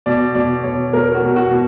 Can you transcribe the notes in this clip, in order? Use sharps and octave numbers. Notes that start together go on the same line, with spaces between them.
B2 D5
B2 D5
B2 C#5
B2 A#4
F#4
B2
F#4
B2